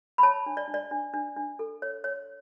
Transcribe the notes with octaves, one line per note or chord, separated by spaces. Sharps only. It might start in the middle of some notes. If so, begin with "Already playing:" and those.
B5
C#5 A5
D4
D5
D4
D5
D4
D4
D4
A4
C#5
C#5